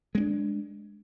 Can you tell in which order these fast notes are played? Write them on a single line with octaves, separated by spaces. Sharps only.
G#3 C4 D4